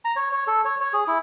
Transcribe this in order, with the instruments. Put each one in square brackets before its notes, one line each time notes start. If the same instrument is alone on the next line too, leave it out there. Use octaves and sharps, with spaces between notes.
[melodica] A#5
C#5
C#5
A4
C#5
C#5
G#4
E4